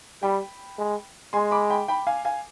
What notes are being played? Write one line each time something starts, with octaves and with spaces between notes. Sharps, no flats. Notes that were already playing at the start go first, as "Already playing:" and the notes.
G3 G5 B5
G#3
G#3 G#5 C6
B5 D6
G5 B5
G5 B5
F5 G#5
F5 G#5